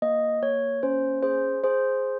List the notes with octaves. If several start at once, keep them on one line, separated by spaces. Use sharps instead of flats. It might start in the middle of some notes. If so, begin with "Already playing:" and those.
A#3 D#5
A#3 C#5
C#4 C5
G#4 C5
G#4 C5